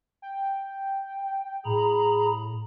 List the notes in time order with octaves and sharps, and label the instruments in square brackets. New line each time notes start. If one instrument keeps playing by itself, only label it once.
[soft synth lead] G5
[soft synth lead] A2 [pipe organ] G#4 A#5 B5